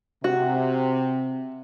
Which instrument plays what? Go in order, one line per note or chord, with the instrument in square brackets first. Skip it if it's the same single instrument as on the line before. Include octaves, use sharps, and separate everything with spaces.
[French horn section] C3 [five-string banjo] F#4